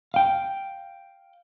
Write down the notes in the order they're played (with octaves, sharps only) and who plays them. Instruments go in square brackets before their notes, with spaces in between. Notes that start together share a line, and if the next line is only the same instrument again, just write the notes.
[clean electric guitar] F5 G5